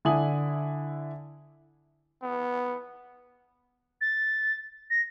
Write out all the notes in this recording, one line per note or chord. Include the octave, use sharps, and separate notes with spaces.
D3 E4 G#5 D#6 F#7
B3
A6
A#6